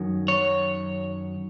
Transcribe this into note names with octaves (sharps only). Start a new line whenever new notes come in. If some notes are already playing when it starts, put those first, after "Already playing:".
Already playing: F#2 D#3 F#3
C#5